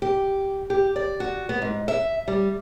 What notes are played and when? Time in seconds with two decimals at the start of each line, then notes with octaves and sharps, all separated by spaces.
0.02 G4
0.70 G4
0.96 D5
1.20 F#4
1.49 B3
1.62 G#2
1.88 E5
2.28 G3